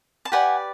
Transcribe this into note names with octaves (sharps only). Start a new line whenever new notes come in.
A5
G4 B4 D5 F#5 G#5